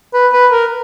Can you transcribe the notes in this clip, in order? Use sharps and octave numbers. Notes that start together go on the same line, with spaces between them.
B4
B4
A#4